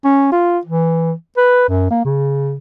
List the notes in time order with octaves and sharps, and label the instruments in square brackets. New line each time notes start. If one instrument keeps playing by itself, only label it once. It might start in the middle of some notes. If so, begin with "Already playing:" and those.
[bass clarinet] C#4
F4
E3
B4
F#2
A#3
C#3